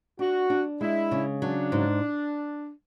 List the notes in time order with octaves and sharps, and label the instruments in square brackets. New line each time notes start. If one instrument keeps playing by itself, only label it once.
[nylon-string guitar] D4 [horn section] F#4
[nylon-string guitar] D4
[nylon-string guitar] G#3 [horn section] E4
[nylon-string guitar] C#3
[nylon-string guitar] F#3 [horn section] D4
[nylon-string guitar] G#2